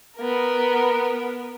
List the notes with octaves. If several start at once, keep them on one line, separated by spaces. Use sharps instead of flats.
B3 A#4